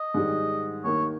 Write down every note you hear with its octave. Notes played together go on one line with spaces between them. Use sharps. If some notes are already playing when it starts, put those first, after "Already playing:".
Already playing: D#5
G#2 D#3 G3
D#2 D#3 A#3 D#4 C#5